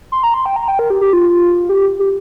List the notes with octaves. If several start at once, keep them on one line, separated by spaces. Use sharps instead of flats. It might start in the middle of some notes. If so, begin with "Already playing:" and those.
C6
A#5
C6
G5
A#5
G5
A#4
G4
G4
F4
G4
G4